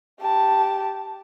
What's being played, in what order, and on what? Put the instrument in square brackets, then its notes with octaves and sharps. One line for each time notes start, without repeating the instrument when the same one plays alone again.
[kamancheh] G4 A5